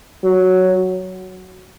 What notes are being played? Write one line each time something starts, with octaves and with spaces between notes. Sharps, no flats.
F#3